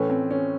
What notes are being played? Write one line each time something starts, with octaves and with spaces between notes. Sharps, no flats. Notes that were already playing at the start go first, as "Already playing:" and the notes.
Already playing: A2 E3 A3 C#4
C4
C#4